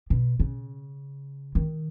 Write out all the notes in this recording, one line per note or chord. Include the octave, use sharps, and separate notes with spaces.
B2
C#3
D#3